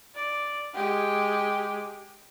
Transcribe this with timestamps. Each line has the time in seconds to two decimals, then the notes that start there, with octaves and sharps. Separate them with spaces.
0.15 D5
0.74 G#3 G4